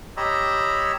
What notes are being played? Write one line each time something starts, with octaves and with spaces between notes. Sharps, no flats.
G4 C#5 D#5 A#5 B5 E6